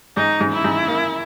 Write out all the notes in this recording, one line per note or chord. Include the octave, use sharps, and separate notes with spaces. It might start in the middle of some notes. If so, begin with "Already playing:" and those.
G#2 D#4
G#2
E4
G#2
A#3